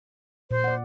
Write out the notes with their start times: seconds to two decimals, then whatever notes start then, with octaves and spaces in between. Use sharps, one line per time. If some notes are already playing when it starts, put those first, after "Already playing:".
0.51 A#2 C5
0.64 D5 F#5